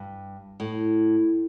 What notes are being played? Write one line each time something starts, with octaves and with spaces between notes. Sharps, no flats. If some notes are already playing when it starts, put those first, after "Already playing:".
Already playing: G2
A2